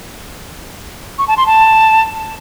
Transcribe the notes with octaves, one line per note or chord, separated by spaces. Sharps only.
C#6
A5
C6
A5